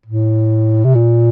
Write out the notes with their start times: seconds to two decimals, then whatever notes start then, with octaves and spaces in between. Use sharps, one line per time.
0.06 A2
0.84 C3
0.95 A#2